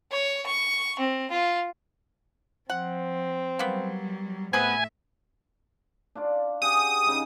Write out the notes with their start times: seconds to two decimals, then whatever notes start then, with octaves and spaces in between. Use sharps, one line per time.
0.12 C#5
0.46 C#6
0.99 C4
1.31 F4
2.70 F3 C4 F#5
3.59 F#3 G3 A#3 B3
4.53 A2 B3 C4 G#4 B4 E5 G#5
6.15 D4 F4 D5
6.62 G4 G#4 F#5 D#6
7.06 C#3 D#4 G#4